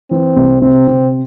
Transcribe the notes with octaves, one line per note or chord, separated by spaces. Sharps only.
E3 C4
C2
C3 C4
C3